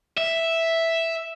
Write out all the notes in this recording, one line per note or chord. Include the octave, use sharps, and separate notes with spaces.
E5